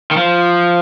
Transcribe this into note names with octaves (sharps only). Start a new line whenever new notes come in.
D#3
F3